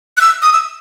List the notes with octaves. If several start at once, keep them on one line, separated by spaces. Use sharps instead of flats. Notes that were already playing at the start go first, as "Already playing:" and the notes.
F#6
E6
D#6
E6